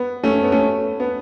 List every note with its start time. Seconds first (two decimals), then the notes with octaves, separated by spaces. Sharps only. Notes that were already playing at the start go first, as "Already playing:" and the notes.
Already playing: B3
0.23 A3 C#4
0.43 B3
0.52 A3 C#4
1.00 B3